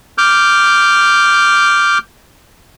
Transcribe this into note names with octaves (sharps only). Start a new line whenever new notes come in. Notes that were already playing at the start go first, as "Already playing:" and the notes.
D6 F6 G6